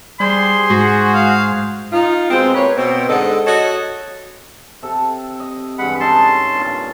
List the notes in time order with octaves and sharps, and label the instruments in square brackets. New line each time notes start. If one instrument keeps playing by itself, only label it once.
[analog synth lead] G3 [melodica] G#4 C5 [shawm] C6
[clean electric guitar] G#2 [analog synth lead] F#4
[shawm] F5
[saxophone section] D#4 F4
B2 G#3 C4
A#3 B4 C#5
B2 C4
G#2 D3 A4 D#5 F#5
F#4 A4 C#5 D#5
[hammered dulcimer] C3 A4
D#5
[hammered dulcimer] G2 E3 G#3 [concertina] F#5 B5
[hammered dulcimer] C#4 D#4 A4 [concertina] A5 C6
[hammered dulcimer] G2 A#2